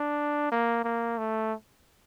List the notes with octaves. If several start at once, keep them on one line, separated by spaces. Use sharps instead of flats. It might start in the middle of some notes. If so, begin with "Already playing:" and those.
Already playing: D4
A#3
A#3
A3